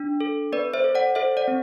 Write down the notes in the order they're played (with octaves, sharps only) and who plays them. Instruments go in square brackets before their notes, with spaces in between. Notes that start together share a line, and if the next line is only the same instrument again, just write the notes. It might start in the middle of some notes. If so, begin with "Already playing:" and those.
Already playing: [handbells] D4
A4
B3 B4 D5
C5 E5
A4
D5 F#5
A4 C5 E5
D5 F#5
C4